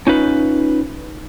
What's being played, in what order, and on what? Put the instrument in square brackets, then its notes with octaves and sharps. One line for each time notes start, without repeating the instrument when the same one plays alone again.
[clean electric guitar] C#4 D#4 F4 B4